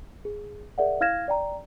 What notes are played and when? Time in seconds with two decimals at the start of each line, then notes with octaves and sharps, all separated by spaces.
0.25 G#4
0.78 G#4 A#4 D5 E5 F#5
1.01 E4 F5 F6 G#6 A#6 E7
1.28 D5 G5 A#5